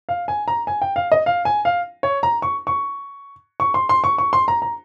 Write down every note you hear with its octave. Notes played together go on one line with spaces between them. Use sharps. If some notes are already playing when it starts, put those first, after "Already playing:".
F5
G#5
A#5
G#5
G5
F5
D#5
F5
G#5
F5
C#5
A#5
C#6
C#6
C#6
C6
C6
C#6
C#6
C6
A#5
A#5